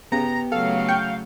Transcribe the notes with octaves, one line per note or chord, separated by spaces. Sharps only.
C#3 B3 G4 A#5
C#3 F#3 A3 A4 F5
G5 C#6 G6